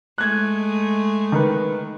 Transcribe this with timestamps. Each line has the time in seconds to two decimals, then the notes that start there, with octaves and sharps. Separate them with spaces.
0.18 G#3 A3 F#6 G#6
1.32 D#3 B4